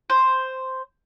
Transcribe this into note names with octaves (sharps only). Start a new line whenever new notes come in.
C5